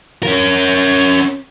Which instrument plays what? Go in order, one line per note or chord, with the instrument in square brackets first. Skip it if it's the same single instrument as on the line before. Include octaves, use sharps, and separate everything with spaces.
[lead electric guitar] C#4 A#4